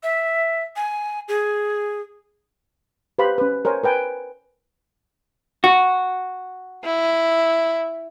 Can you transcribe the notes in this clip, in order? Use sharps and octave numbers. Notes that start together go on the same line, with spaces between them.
E5
G#5
G#4
G4 B4 C5 F5 B5
C#4 B4
A#4 C5 C#5 G#5
A#4 B4 G5 G#5
F#4
E4